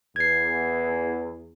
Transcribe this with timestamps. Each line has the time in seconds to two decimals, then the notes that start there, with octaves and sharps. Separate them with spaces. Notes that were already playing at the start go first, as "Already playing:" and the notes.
0.16 E2 G#6 C7